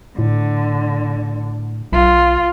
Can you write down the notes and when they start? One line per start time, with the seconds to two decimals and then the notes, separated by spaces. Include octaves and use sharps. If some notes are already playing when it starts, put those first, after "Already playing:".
0.19 A2 D3
1.92 B1 F4